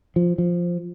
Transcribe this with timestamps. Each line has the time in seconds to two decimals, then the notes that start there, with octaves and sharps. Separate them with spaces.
0.16 F3
0.38 F3